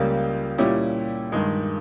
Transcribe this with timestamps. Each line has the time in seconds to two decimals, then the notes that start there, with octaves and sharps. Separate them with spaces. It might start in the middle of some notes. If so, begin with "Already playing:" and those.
Already playing: C#2 C#3 G3 A#3
0.58 A#2 G3 C#4 E4 G4
1.32 G2 D#3 G#3